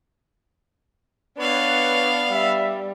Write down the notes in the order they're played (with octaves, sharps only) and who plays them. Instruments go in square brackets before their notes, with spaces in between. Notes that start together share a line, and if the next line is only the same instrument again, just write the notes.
[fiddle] B3 F5 [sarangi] D4 [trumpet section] B4 C#5
[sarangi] G3 [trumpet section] E5